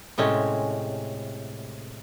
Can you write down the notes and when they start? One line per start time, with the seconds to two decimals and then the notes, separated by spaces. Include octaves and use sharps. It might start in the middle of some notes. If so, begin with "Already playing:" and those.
0.18 A2 C3 G#3 C#4